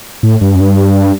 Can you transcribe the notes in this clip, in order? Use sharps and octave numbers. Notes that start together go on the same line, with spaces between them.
A2
G2
F#2
G2